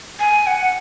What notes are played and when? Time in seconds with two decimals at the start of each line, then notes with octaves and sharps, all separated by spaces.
0.20 G#5
0.47 F#5